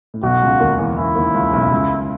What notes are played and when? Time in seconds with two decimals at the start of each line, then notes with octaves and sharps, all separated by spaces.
0.14 A2
0.23 B1 B2 F#4
0.42 C#2 C#3
0.60 D#2 D#3
0.78 E2 E3
0.97 E2 E3 E4
1.15 D#2 D#3
1.34 C#2 C#3
1.53 B1 B2
1.72 C#2 C#3